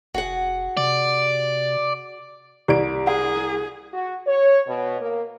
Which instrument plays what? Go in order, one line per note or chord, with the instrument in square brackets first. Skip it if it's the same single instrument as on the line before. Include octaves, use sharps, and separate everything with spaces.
[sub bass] F1 [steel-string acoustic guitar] F#4 G#4 F#5
[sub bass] C3 [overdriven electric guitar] D5
[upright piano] C2 D7 [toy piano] G4 D5
[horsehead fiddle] G#4 [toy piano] F#5
[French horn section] F#4
C#5
B2
A#3